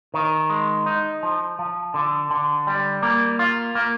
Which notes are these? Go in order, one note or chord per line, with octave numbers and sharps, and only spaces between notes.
D#3
G#3
D#4
F3
F3
D3
D3
G3
A#3
F4
A#3